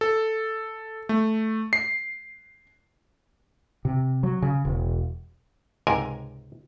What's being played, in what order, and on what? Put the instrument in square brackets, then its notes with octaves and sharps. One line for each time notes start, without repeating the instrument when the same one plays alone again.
[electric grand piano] A4
A3
C7
[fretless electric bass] C3
F#3
C#3
E1
[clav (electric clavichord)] C#2 G#2 C3 A#4 G#5